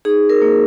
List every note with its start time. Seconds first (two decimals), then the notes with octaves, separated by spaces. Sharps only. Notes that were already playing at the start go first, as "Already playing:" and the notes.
0.05 D#4 G#4
0.23 D#4
0.30 A#4
0.42 A#3